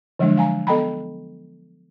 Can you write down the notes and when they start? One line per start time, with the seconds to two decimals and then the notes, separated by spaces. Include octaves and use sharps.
0.19 D3 F3 F#3 G#3 D4
0.37 F5 G#5 A#5
0.67 B3 A4 D#5 G5 A#5 B5